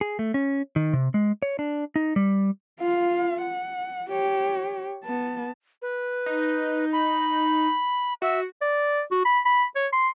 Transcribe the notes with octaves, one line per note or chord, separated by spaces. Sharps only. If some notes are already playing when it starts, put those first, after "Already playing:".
G#4
A3
C#4
D#3
C3
G#3
C#5
D4
D#4
G3
F4 F5
F#5
G4 C#5
B3 A5
B4
D#4
B5
F#4 E5
D5
F#4
B5
B5
C#5
C6